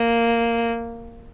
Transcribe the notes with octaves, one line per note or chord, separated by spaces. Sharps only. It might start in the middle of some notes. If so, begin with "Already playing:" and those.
Already playing: A#3